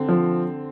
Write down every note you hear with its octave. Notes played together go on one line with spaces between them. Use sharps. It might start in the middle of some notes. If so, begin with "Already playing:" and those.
Already playing: D3 C4
F3